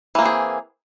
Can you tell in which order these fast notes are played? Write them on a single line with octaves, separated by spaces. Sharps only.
E3 A#3 C4 G#4